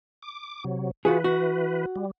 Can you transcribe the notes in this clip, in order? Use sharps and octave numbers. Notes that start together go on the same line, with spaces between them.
D6
C3 F#3
E3 F4 F#4 G#4 B4
F#4
G3